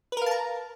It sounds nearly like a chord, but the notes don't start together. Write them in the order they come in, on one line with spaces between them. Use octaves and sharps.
B4 A#4 F5 A5 A#5